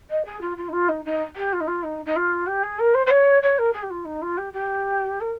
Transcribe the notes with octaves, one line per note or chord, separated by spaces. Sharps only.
D#5
G#4
F4
F4
D#4
F4
D#4
D#4
G4
F4
D#4
F4
D#4
D#4
F4
G4
G#4
A#4
C5
C5
C#5
C#5
A#4
G#4
G4
F4
D#4
F4
G4
G4
A#4